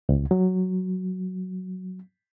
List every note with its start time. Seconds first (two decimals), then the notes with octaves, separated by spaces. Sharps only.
0.09 C#2
0.31 F#3